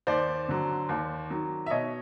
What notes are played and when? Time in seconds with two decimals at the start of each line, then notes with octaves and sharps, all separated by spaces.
0.07 D#2 C5 D5
0.49 D3 F#3
0.89 D#2
1.30 D#3 F#3
1.66 E5
1.70 B2 C#5 D#5